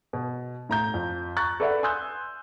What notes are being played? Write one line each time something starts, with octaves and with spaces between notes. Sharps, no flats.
B2
A2 A#5 G6
F2
A#5 C#6 F#6 A6
A4 B4 D5 E5 F#5
G#5 C6 D#6 E6 F#6 G6